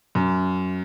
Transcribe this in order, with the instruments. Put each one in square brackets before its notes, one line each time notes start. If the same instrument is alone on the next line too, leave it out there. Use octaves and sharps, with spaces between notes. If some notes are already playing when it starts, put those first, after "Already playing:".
[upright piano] F#2